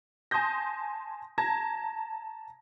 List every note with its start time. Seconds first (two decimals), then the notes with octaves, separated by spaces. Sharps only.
0.31 G#5 A5 C6 D#6 G6 A#6
1.38 A5 A#5 G#6 A#6